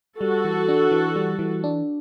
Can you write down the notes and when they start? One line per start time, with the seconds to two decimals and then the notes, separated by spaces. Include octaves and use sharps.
0.20 G3 F#4 A4
0.45 E3
0.68 D4
0.92 E3
1.16 G3
1.39 E3
1.64 D4